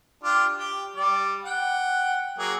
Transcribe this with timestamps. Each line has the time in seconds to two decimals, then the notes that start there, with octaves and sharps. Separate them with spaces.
0.24 D4 F4 G4
0.58 G4 G5
0.96 G3 D5
1.45 F#5 G5
2.38 F#3 A#3 G#4